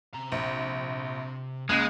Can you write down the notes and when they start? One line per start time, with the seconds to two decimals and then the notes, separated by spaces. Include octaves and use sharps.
0.14 C3 A#5
0.32 A#1
1.69 C#2 G#3 A#3 F#6